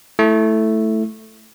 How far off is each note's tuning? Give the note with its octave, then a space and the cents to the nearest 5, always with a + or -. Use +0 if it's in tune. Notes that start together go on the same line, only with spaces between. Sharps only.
A3 +0 E4 +0